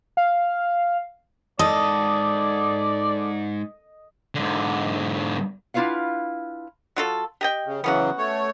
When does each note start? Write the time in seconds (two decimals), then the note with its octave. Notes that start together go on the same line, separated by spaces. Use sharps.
0.17 F5
1.59 G#2 A4 D5 D#5 A5
4.35 G#2 D3
5.74 D4 E4 F4 B4 F5 F#5
6.96 F#3 F4 A4
7.41 G4 D#5 G5
7.66 C#3
7.84 C#3 E3 F#3 B3 C#4 F#4
8.18 A3 C#5